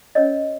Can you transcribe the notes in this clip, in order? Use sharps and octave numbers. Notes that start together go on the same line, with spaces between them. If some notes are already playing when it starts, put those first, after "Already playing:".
C#4 A#4 C#5 D#5